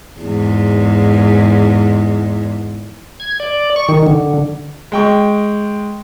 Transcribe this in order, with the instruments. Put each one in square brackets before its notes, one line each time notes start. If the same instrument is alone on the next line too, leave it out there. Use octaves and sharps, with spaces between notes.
[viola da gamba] E2 G#2
[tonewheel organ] G#6
D5
C#6
D#3
D3
[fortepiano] G#3 G5 C#6